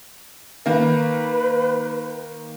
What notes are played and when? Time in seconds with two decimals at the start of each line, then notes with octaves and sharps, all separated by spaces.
0.66 D#3 A#3 B4